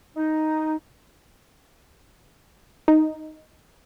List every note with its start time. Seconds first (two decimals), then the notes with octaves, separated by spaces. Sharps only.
0.17 D#4
2.88 D#4